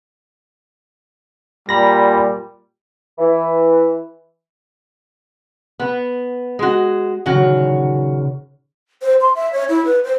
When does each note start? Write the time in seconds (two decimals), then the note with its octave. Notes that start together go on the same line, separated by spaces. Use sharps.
1.69 A#2 G3 A#5 B5 A#6
3.19 E3
5.80 B3
6.59 G#3 F#4
7.26 D#1 C#3 F#3 F#4 A#4
9.02 C5
9.20 C6
9.35 E5
9.53 C#5
9.69 E4
9.85 B4
10.04 C5